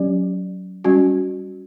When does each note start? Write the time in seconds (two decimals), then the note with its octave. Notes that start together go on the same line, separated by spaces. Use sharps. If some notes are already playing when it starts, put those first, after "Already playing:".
Already playing: F#3 C#4 G4 D5
0.84 G3 C#4 F#4